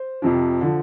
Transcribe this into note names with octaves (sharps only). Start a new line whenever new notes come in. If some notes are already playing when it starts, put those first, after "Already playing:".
Already playing: C5
F2 C3 F3
D3 F3